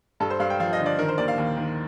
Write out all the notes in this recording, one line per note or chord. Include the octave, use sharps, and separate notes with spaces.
G2 A4
C5
G2 F5
G5
F3 F5
D#5
D3
D5
D#3 A#4
C5
D#2 D5
F5
D#2
D#3